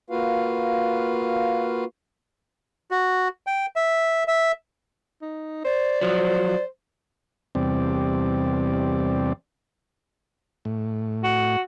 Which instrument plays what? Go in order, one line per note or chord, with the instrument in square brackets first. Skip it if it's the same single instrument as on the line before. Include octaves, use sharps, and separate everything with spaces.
[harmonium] A#3 F4 F#4 B4 F5
[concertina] F#4
G5
E5
E5
[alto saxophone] D#4
[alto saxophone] C5 [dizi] D5
[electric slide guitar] F3 F#3 [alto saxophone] C5
[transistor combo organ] E2 C3 G3 C4 D5
A2
[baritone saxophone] F#4